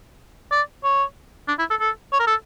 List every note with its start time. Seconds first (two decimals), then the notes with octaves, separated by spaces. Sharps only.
0.52 D5
0.84 C#5
1.48 D4
1.59 E4
1.70 A4
1.80 A4
2.13 C#5
2.20 A#4
2.27 A4